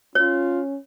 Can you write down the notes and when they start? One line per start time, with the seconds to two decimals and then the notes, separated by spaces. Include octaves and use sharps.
0.15 C#4 F4 C#5